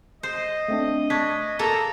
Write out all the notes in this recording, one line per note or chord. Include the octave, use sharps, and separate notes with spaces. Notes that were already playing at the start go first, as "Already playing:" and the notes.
C5 D#5
A3 C4 D4
D4 C#6 G#6 B6
A#3 A4 A#5